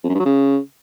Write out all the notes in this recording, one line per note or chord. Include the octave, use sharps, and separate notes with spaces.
F2
F#2
G2
F#3
C#3